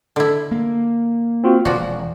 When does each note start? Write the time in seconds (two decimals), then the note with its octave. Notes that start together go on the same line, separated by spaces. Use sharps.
0.16 D3 E4
0.51 A#3
1.44 C4 F4 F#4
1.65 E1 F3 F#4 D5